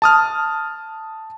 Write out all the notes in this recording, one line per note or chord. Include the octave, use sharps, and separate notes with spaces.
A5 D#6 F6